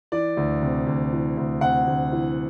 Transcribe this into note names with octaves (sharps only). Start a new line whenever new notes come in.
E3 D5
D2
C3
D2
E3
D2
C3 F#5
D2
E3